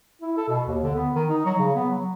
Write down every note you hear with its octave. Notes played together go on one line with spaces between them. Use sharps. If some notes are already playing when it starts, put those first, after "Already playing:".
E4
A4
B2
D#2
D3
B3
D#3
D#4
F#3
C#3
B3
F#3